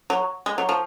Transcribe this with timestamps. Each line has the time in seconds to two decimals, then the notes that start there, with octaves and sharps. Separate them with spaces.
0.10 F#3
0.46 G#3
0.58 F#3
0.69 F3